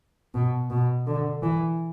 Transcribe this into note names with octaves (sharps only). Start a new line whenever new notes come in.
B2
B2
D3
E3